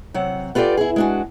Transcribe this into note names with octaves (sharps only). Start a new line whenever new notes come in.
C3 F#3 F#5
B3 F4 G4 A4 D5
E4 G#4
G#3 D4 F#4